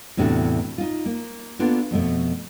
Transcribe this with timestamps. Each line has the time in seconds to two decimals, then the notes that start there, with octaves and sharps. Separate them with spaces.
0.17 E2 A2 C3 D4 F#4 A4
0.78 D#4 F4
1.06 A#3
1.59 A#3 B3 D4 F4 A4
1.91 F2 B2 A3